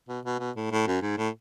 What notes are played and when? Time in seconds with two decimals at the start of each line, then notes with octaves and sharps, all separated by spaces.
0.09 B2
0.25 B2
0.39 B2
0.56 A2
0.72 A2
0.87 F#2
1.02 G#2
1.18 A2